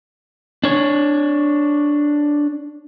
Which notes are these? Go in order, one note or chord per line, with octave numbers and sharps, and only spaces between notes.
D4 C#5